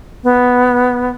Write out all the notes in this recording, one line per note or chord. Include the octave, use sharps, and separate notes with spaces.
B3